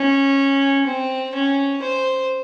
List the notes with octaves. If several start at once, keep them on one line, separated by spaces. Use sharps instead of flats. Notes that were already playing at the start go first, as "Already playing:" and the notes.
Already playing: C#4
C4
C#4
C5